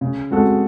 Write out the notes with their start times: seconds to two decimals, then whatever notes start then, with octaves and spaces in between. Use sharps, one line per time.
0.01 C#3
0.31 G#3 C4 F#4 A4